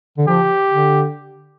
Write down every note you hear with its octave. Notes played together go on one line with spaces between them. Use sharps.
D3
F3 G4
D3